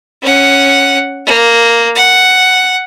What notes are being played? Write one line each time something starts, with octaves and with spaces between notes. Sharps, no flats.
C#4 F#5
A#3
F#5